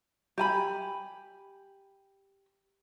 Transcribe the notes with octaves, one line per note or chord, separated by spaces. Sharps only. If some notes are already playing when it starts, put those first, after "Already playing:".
G4 G#5 B5